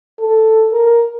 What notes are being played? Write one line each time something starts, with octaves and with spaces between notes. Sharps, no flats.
A4
A#4